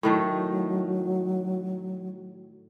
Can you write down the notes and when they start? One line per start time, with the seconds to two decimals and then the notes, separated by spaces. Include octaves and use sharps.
0.03 A2 D#3 F#3 A3